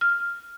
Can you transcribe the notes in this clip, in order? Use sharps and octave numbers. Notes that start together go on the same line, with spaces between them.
F6